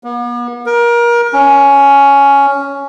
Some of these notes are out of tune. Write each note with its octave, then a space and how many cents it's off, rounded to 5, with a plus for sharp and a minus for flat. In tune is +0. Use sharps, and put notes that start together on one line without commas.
B3 -45
A#4 +25
C#4 +10